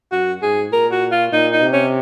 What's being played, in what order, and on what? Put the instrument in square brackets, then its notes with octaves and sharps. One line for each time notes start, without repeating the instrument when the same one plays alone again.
[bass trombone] F#2 [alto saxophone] F#4
[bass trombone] G#2 [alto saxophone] G#4
[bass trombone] A#2 [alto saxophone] A#4
[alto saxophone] F#4
F4
[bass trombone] A#2 [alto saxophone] D#4
[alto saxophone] D#4
[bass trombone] C3
[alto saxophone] C#4